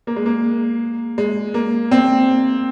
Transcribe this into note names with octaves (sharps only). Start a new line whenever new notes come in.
A#3
G#3
A#3
G#3
A#3
C4